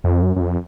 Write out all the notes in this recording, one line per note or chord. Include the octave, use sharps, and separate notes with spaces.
F2
F#2
F#2
F2